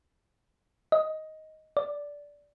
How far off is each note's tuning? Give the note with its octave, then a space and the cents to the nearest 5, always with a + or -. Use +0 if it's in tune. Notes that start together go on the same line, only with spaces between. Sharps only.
D#5 +10
D5 -10